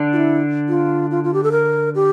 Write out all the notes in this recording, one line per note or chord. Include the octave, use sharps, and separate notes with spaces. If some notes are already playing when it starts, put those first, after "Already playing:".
Already playing: D3 D4
F4
E4
F4
F4
F4
G4
A4
A#4
G4